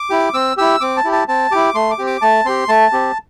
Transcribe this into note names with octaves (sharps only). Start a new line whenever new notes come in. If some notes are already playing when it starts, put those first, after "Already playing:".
Already playing: D6
E4 G4
C4 E6
E4 G4 E6
C4 D6
A5
E4 G4
A5
C4 A5
E4 G4 D6
A3 C6
D6
C4 G4
D6
A3 A5
C4 G4 C6
A3 A5
C4 G4